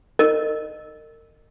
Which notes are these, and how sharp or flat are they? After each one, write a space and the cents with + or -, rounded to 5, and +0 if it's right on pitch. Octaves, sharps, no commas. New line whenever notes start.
A#4 -35 D#5 -25